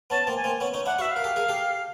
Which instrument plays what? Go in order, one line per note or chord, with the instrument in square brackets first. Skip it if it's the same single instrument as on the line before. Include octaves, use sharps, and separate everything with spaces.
[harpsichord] B3 C#4 [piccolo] A5
[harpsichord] A#3 C4
[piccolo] G#5
[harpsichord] A#3 C4
B3 C#4
C#4 D#4
[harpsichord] D4 E4 [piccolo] F#5
[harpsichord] E4 F#4
[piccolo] E5
[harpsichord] A#4 [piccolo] F5
[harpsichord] G4 A4
G#4 A#4
G4 A4